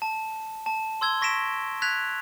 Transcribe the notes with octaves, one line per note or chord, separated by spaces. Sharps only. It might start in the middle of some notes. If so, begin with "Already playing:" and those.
A5
A5
C6 E6 G#6 G7
C#6 A#6 B6 D7 E7
F#6 G#6 B6 F7